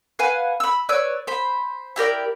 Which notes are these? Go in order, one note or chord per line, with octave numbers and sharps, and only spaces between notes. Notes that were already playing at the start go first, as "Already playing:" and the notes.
B4 F5 F#5 G#5
B5 E6
B4 C#5 D5 E6
C5 B5
E4 G4 A#4 D5